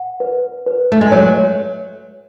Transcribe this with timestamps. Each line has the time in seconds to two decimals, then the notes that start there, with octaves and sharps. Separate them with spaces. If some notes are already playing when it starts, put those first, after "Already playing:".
Already playing: F#5
0.20 B4
0.66 B4
0.92 A3
1.01 G#3
1.11 F#3 C#5